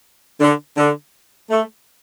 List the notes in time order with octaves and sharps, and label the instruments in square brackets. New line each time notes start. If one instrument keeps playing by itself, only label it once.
[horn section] D3
D3
A3